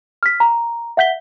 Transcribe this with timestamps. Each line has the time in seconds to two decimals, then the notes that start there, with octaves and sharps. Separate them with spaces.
0.23 F6 B6
0.40 A#5
0.97 E5 F#5 G6 B6 G7